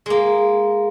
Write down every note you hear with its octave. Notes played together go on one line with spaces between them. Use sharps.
G#3 A#3